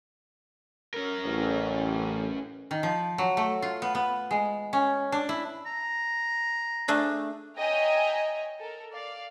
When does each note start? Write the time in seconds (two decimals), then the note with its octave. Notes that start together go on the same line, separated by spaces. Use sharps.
0.94 C#4 A#4
1.25 A1
2.71 D#3
2.83 F3
3.18 F#3
3.37 A3
3.62 F4
3.82 B3
3.95 B3
4.31 G#3
4.73 C#4
5.12 D4
5.29 E4
5.66 A#5
6.88 A3 D4 G#4
7.57 C#5 D#5 E5 G5 G#5 A#5
8.58 A4 A#4
8.93 D5 F5